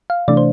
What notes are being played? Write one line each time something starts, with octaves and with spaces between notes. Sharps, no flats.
F5
C3 E3 A3 D4 D5
C5